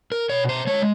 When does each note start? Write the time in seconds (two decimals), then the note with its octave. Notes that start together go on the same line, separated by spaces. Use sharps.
0.12 A#4
0.29 B2 C#5
0.49 C5
0.67 G#3 C#5